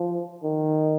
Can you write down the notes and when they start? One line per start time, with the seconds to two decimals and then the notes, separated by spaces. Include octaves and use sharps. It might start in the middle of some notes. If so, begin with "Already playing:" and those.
Already playing: F3
0.43 D#3